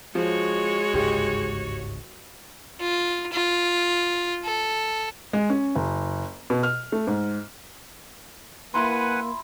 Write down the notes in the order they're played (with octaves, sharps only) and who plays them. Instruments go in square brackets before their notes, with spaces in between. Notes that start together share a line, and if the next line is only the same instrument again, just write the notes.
[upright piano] F3 [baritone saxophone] G#3 [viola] F#4 C#5
[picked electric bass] G1 C#2 G#2 [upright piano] G4
[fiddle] F4
F4
A4
[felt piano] G#3
C#4
F#1
B2
F6
A3
G#2
[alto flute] A#3 [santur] E4 A#5 C6 [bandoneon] B4 F#5 G#5